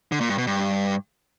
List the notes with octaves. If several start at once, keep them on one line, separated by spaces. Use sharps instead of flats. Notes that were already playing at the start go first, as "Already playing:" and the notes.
D3
A#2
G2
B2
G2